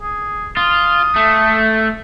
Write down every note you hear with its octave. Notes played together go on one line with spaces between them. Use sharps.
G#4
F4 D#6
A3